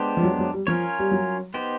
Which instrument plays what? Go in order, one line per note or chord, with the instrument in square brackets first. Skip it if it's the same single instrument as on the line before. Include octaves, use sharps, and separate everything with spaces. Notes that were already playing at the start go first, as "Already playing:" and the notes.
Already playing: [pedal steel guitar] G#3 B3 D4 G4 C5
[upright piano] F3
F#3
F#3
G3
[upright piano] F3 [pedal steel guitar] C#4 F4 A#4 C#5
[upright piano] G3
F#3
[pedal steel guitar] B3 D#4 G4 C5